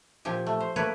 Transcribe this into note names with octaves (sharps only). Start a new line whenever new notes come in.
A#2 F3 G4 G#5
A3
C5
A3 A#3 A#4 B4 C#5